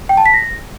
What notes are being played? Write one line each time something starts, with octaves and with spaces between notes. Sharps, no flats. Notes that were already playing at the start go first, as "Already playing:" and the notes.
G5
A5
B6
A#6